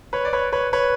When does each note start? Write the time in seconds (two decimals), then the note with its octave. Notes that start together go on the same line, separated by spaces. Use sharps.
0.13 B4 C#5
0.25 D5
0.33 B4 C#5
0.52 B4 C#5
0.73 B4 C#5